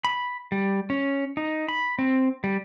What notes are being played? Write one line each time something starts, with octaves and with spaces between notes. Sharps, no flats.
B5
G3
C#4
D#4
B5
C4
G3